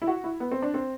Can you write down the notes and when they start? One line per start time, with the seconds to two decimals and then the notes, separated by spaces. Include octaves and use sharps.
0.02 E4
0.07 F#4
0.24 E4
0.40 B3
0.51 C4
0.62 D4
0.74 C4